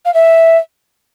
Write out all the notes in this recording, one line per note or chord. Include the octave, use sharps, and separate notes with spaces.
F5
E5